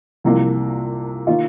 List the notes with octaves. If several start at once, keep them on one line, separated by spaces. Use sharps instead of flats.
C2 C3 F3 A#3
D#3 A#3 F4